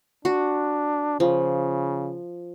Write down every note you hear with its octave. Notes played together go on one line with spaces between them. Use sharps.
D4 F#4
C#3 F3